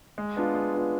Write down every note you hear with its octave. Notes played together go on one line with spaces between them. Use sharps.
G#3
B3 D4 F4
G#3
B3 D4 F4